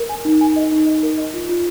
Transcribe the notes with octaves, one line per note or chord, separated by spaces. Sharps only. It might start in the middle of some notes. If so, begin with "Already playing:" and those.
Already playing: A#4
G#5
D#4
G#5
D#5
D#4
D#5
A#4
D#5
F4
F4